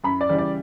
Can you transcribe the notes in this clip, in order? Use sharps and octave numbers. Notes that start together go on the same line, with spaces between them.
F#2 B5
D5
C#3 E3 G3
D5